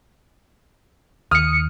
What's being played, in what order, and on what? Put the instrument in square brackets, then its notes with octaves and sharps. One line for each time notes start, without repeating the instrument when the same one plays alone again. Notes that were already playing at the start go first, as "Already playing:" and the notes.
[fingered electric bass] D#2 [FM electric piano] D#6 C#7 [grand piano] F6